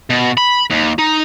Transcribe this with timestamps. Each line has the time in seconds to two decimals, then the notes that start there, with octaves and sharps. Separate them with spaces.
0.10 B2
0.37 B5
0.70 D#2
0.99 D#4